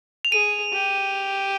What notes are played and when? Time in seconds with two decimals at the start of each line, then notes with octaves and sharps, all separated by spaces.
0.25 F7
0.32 G#4 D#7
0.73 G4